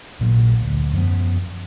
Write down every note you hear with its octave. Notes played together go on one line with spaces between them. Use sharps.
A#1 A#2 F#3
D2
F#2 F3 B3